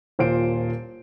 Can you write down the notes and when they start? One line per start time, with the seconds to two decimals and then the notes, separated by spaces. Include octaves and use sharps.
0.19 D#1 A#2 C5 D7